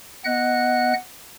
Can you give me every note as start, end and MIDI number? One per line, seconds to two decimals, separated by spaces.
0.25 0.93 59
0.25 0.93 75
0.25 0.93 78
0.25 0.93 90